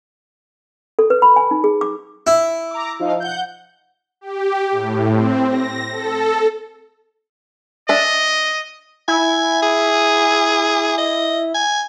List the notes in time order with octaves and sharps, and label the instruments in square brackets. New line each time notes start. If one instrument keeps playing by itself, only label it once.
[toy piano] A4
B4
B5
G#5
D#4
G#4
D6
[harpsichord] E4
[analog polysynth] A#5 D6
F3 D#4 F5
F#5 G6
[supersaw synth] G4
A2
C4
A#6
A4
[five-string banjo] D4 E5 [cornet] D#5
[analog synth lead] E4 [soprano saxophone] G#5
[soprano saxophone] G#4
D#5
G#5